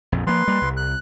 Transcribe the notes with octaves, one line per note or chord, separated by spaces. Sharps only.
A#1 F2
F3 A#3 B4 C6
G3 A#3
C2
F#6